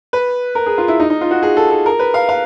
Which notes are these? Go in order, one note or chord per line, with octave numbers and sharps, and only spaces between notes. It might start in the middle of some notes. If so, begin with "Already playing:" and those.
B4
A#4
G#4
F4
E4
D#4
D#4
F4
F#4
G#4
A4
A4
A#4
B4
F5
F5